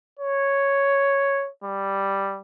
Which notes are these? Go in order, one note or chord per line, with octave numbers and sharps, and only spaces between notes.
C#5
G3